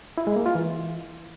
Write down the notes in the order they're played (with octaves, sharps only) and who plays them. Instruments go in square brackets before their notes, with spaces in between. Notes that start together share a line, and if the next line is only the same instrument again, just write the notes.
[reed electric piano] E4
G#3
A#3
F4
E3